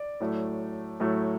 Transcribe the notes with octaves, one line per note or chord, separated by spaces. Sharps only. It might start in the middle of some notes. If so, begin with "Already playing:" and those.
Already playing: D5
A2 F#3 A3
A2 F#3 A3